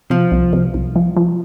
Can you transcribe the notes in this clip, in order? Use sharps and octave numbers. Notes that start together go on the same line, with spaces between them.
C3 F3
C2
C3
C2
F3
F3